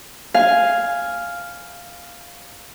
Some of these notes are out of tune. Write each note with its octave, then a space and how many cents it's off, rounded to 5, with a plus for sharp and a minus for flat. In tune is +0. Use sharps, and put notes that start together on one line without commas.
F5 +0 G#5 +0